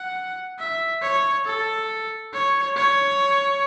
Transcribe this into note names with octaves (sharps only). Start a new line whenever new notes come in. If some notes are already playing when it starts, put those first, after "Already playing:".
Already playing: F#5
E5
C#5
A4
C#5
C#5